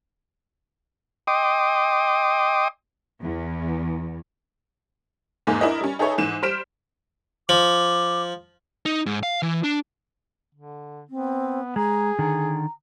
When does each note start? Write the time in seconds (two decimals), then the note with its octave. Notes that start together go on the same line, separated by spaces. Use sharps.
1.27 D#5 G5 C6 D6 D#6
3.22 E2
5.47 E2 G#2 G#3 A#3 G#5
5.61 D4 E4 A#4 D#5
5.81 G3 C#4
5.99 D#4 G#4 A4 B4 C#5 E5
6.18 G#2 E3 D#7 E7
6.42 G3 C5 F6 B6 D7 E7
7.49 F3 D6
8.86 D#4
9.06 G#2
9.23 F5
9.42 E3
9.64 D4
10.55 D3
11.09 B3 C4
11.76 G#3 G#4 A#5
12.19 D3 D#3 A#5